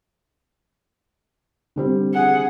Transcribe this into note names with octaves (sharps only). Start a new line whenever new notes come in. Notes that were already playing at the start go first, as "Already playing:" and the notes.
D3 G3 C4
G#4 F#5